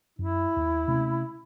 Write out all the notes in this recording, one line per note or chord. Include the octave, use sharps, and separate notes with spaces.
F#2 E4
D#2
C3 A3 C#4